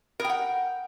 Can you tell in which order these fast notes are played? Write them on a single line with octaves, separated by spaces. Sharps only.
A#4 G5 F#5